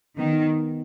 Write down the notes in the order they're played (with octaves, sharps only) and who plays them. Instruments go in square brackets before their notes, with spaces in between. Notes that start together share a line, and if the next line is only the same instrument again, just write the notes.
[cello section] D#3 [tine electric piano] B3
[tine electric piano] D#4